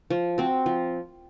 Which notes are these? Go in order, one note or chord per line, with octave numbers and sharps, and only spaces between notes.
F3
C4 F#4
F3